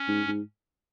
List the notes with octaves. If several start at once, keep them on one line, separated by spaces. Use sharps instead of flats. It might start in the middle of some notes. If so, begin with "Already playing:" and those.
Already playing: C#4
G#2
G#2